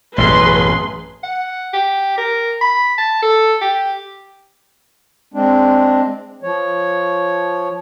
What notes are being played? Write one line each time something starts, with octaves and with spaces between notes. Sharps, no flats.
A1 F#2 B2 G#4 B4 C6
F#5
G4
A#4
B5
A5
A4
G4
G#3 C4 D4
F3 C#5